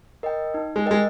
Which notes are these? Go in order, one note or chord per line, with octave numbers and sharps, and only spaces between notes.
A#4 D#5 G5
D#4
G#3
G#3 A#4 D#5 G5